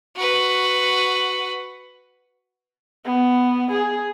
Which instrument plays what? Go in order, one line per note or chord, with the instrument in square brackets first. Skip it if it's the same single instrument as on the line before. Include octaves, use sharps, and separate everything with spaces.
[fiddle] F#4 B4
[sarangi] B3
G#4